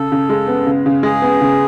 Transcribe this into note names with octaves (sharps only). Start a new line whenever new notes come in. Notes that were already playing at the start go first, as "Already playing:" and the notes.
Already playing: C#3 A4
C#3
G#3
B3
C#3
C#3
G#3 G#4
B3
C#3